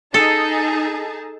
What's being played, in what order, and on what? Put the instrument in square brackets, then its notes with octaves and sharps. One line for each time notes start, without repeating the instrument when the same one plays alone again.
[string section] D#4 G#4 A5 [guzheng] A4